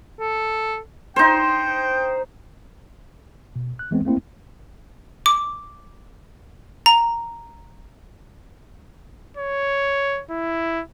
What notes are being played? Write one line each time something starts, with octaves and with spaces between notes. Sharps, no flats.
A4
D#4 C5 G5
B2
F#6
E3 G#3 B3 C4
A3 A#3 C4 E4
D6
A#5
C#5
E4